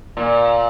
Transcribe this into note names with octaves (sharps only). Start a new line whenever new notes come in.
A#2